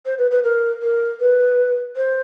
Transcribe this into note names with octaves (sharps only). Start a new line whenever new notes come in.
C5
B4
B4
A#4
A#4
B4
C5